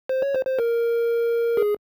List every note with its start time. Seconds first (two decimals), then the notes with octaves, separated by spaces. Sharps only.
0.09 C5
0.22 C#5
0.35 C5
0.46 C5
0.59 A#4
1.57 G#4